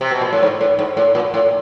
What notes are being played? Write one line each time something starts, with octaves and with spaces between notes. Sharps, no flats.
C3
B2
A#2
A2
G#2
A2
G#2
A2
A#2
A2